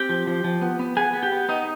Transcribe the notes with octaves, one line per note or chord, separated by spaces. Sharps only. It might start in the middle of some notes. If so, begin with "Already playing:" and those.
Already playing: C4 G4 G5
F3
F3
F3
B3
B3
B3 G#4 G#5
B3
G4 G5
B3
B3 D#4 D#5